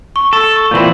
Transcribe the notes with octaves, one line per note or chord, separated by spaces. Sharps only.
C#6
A4
C#6
A#2 E3 C4 G6 F#7